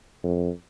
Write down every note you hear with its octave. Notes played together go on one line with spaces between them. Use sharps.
F2